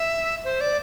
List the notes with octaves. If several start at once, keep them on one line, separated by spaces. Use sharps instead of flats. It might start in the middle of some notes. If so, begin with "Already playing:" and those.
Already playing: E5
C5
D5